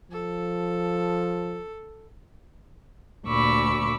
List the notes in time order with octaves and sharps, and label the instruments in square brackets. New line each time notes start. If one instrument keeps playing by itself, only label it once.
[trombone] F3 [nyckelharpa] A4
[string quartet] D2 A#2 B5 C#6 D6 E6